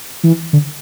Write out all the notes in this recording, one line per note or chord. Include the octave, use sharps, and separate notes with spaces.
E3
D3